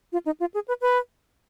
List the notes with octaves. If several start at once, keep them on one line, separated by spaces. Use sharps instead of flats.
F4
D#4
F4
G#4
B4
B4